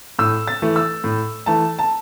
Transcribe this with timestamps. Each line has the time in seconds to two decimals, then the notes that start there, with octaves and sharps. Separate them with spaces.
0.19 A2 E6
0.48 A6
0.62 E3 A3
0.76 E6
1.04 A2
1.46 E3 A3 A5
1.79 A5